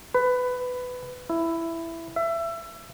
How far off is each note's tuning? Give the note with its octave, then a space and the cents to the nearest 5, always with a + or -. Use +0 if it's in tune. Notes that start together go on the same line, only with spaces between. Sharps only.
B4 +15
E4 +10
E5 +25